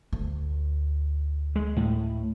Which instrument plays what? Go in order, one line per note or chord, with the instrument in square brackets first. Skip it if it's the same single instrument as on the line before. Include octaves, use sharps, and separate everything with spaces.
[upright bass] D2
[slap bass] G#3
A2